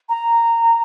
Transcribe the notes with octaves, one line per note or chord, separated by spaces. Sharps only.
A#5